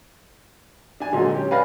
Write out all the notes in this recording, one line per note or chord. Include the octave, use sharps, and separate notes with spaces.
D4 G#5
A#2 D3 F#3 G#3
C#4 G4
B4 D5 F5 G#5 B5 A#6